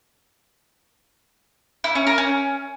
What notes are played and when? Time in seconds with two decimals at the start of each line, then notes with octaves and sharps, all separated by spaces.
1.84 E4
1.95 C#4
2.07 A#4
2.18 C#4